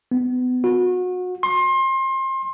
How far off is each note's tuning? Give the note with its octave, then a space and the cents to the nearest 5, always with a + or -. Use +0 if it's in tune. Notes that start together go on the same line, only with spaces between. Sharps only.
B3 +30
F#4 -30
C6 +30